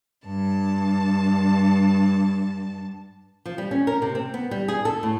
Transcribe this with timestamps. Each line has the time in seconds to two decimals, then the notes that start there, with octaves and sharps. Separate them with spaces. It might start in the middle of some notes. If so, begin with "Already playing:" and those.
0.26 G2 A5
3.46 F3
3.58 G3
3.71 C#4
3.87 A#4
4.02 C3
4.15 C4
4.34 B3
4.51 G3
4.68 G#4
4.85 A4
5.03 A2